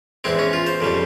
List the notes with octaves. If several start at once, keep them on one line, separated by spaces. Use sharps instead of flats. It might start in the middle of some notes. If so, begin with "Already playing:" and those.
E2 E3 G#3 C4
C#4
F4
C5
F2 C#3 G3